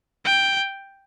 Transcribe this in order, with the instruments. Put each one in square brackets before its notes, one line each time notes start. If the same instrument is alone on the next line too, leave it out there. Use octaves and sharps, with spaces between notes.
[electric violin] G5